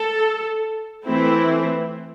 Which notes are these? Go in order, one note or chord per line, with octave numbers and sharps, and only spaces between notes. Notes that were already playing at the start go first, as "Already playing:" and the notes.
Already playing: A4
E3 A3 C4 E4